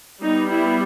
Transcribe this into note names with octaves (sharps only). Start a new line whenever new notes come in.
G3 B3 D#4
E4